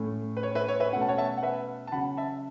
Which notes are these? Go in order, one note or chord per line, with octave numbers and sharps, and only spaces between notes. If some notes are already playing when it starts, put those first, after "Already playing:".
Already playing: A2 A3 C#4
B4
C#5
B4 E5
C#5
B4 E5
B2 A3 C#4 F#5
A5
C#5 F#5
E5 A5
F#5
B4 E5
A5
C#3 F#3 C#4 F#5 B5
E5 A5